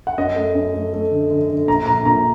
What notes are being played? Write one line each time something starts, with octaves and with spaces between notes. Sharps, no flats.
F#5
F#2 D#5
A3
F#2
A3
A3
D3
D3
D3
A#1 A#5
A#1 A#5
A#2 A#5